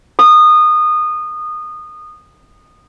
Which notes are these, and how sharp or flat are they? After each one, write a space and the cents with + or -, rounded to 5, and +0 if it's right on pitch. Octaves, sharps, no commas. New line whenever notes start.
D#6 -20